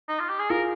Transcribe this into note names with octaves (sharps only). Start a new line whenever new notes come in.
D#4
F4
G4
G#4
F4 G#4 A#4